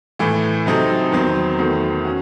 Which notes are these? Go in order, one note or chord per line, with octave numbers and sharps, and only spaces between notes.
A2 E3 A3
C3 F#3 C4 D#4 A4
E2 D#3 F#3 C4
E2 D#3 A3 C4 F#4
C#4 F#4